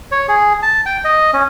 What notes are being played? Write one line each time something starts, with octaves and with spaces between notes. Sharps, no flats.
C#5
G#4
A5
G5
D#5
C#4